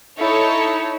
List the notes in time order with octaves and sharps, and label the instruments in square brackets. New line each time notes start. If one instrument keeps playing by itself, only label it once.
[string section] D#4 A4 C#5 [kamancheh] E4